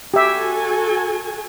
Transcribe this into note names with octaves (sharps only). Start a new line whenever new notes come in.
F#4 G4 A4 E5 G#5